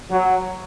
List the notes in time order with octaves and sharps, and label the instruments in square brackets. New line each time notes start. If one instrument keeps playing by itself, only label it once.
[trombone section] F#3